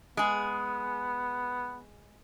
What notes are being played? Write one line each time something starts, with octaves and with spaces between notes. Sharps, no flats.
G#3 B3 G#4